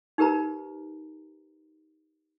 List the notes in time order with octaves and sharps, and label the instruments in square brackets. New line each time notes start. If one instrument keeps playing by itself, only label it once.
[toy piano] D#4 G4 A#4 B4 A#5